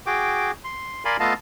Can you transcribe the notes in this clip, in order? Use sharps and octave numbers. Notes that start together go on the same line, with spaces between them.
F#4 G#4 G5 D6
C6
A#4 D5 F5 G#5 B5 C6
A3 B3 F4 D#5 F5 A5